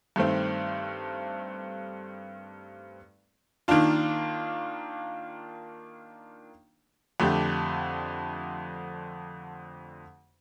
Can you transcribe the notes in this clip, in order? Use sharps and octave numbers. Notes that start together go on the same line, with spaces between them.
G2 D#3 A3 C4
D#3 A#3 D4 F4
F2 D3 A3 D4 G4